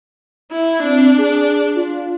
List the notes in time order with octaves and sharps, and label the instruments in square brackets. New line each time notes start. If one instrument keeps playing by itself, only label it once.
[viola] E4
[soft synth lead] C4 [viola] D4
[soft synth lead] G#4
F4